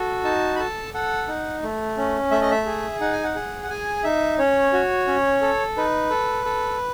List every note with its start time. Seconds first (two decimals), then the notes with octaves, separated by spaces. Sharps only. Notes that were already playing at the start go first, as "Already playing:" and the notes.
Already playing: F#4 A4
0.24 D#4 A5
0.55 B5
0.59 A4 A5
0.94 A4 F#5
1.28 D#4
1.63 A3
1.97 C#4
2.31 A3 E5
2.42 D#5
2.51 E5
2.66 G#4
3.01 D#4 F#5
3.12 G#5
3.24 F#5
3.35 G#4
3.63 F#5
3.70 G#4 G#5
4.04 D#4 E5
4.39 C#4 C#5
4.73 F#4
5.08 C#4
5.42 A4
5.77 D#4 B4
6.10 A4
6.45 A4